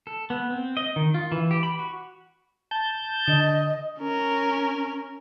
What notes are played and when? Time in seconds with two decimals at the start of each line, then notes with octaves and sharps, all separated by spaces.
0.07 A4
0.30 B3
0.50 C4
0.77 D#5
0.96 D#3
1.14 F4
1.32 E3
1.51 G4
1.63 B5
1.79 F#4
2.71 A5 G6
3.28 D3 D#5
3.99 C#4 A#4